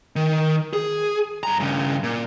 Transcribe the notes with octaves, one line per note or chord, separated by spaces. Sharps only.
D#3
G#4
G2 A#5
G2 C#3
A#2